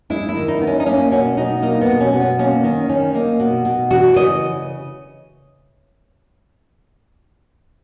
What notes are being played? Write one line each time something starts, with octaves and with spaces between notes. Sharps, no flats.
G#3 E4
E4
D#3
D#4
B3
C#4
D#4
A#3 C#4
B2 C#4
B2 D#4
A#3 D#4
B3
B2
C#4
B2
B3
A#3 C#4
D#3 C#4
D#3 C#4
A#3 D#4
B2
B2
E3 F#4
C#3 D#5